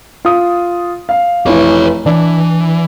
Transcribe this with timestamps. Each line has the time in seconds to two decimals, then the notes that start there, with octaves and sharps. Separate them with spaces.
0.25 F4 D#6
1.09 F5
1.46 F1 E3 B4 C#5
2.06 E3 D4